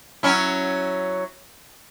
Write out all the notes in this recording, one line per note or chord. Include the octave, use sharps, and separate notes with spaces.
F#3 C#4 E4